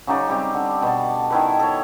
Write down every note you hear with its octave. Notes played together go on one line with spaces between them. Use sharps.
C#3 F#3 D#4 D5
G3 C4 G4
D3
B2 A5
D#3 E4 B4
A4 C#5